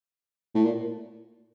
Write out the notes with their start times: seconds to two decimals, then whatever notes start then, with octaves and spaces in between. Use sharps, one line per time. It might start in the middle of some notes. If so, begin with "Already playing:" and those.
0.55 A2
0.65 A#2